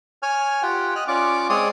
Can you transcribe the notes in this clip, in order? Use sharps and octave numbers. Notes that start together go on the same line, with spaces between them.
C#5 G#5 F6
F4 G4 F#5 G5
D#5 F6 F#6
C#4 F4 D5 C#6 D6
G#3 C4 C#5 D5 C6 D#6